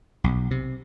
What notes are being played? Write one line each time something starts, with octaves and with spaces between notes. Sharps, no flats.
B1
C3